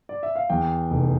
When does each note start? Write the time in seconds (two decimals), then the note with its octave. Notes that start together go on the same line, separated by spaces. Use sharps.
0.09 D5
0.23 E5
0.36 F5
0.50 E2 G5
0.91 F1